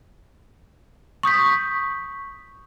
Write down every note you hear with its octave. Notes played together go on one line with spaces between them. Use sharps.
C#6 D#6 G6 B6